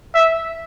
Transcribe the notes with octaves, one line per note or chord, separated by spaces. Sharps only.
E5